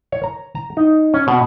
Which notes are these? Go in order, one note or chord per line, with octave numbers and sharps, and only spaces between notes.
C#5
A#5
A#5
D#4
C#4
B2